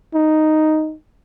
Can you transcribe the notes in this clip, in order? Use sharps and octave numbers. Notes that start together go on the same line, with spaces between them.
D#4